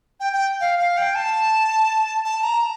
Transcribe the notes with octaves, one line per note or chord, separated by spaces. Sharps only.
G5
G5
F5
F5
G5
A5
A5
A#5